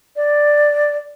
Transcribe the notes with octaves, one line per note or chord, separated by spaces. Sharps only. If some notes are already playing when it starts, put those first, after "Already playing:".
D5